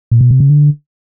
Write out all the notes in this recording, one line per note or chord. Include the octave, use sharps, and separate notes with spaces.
A#2
B2
C3
C#3
D3